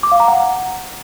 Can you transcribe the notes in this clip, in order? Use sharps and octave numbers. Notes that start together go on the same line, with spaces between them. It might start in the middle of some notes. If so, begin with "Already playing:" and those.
D6
F5
A#5
F#5